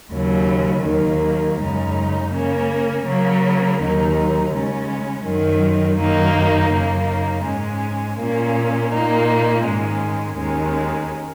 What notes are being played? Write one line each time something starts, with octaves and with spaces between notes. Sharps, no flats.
D#2 C#3 F#3
D#2 D#3 F#3 A#3
F#2 C#3 G#3 D#4
C#3 A#3 C#4
C#3 F#3 A#3
D#2 D#3 F#3 D#4
C#3 G#3 C#4
F#2 D#3 F#3
F#2 D#3 F#3 A#3 D#4
F#2 C#3 A#3 D#4
G#2 G#3 C#4
A#2 A#3 C#4
A#2 A#3 D#4
G#2 D#3 G#3 C#4
D#2 D#3 G#3 C#4